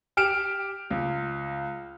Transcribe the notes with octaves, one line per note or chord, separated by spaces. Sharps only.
G4 F6 D7 E7
C#2